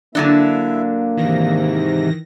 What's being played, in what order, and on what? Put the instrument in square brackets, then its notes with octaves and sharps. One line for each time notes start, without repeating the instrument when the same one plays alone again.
[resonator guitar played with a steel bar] D3 F#3 D4 [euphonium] A#3 [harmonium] E4 E5
[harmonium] G#2 C3 [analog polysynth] D#3 E3 A#6